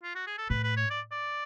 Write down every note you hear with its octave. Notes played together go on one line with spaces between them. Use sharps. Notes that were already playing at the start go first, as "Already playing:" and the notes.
F4
F#4
G#4
A4
A2 B4
B4
C#5
D5
D5